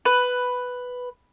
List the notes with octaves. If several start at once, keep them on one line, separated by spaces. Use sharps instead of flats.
B4